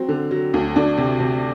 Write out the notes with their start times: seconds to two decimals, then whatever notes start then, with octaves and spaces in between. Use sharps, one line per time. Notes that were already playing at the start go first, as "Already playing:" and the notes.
Already playing: F#3 C4
0.09 D3
0.31 F#3
0.54 D2
0.76 D2 D4
0.98 C3
1.20 C3